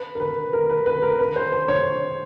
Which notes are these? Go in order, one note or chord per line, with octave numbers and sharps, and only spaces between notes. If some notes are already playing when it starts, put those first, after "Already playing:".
Already playing: B4
A#4
B4
A#4
B4
B4
A#4
B4
C5
C5
C#5